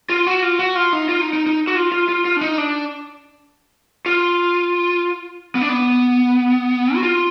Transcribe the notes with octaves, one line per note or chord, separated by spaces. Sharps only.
F4
F#4
F4
F#4
F4
D#4
F4
D#4
D#4
D#4
F#4
F4
F4
F4
F4
D4
D#4
D4
F4
B3
D4
B3
F#4
F4